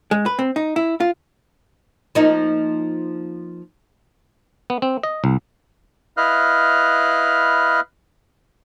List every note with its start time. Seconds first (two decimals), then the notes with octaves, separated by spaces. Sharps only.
0.11 G#3
0.26 B4
0.39 C4
0.56 D#4
0.76 E4
1.00 F4
2.15 F3 A#3 D#4
4.70 B3
4.82 C4
5.03 D#5
5.24 C2
6.17 E4 B4 D#5 F5 F6 F#6